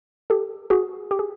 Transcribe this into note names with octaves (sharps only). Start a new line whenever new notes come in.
G4 A4
F#4 G#4
G4
G#4